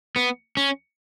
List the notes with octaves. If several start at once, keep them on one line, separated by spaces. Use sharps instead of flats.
B3
C#4